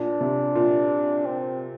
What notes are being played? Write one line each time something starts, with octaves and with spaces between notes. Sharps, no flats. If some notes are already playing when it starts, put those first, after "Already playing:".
Already playing: A#2 D4
C3
A#2
C4